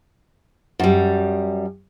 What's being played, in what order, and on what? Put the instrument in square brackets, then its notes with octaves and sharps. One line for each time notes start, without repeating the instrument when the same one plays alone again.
[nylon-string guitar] F#2 G3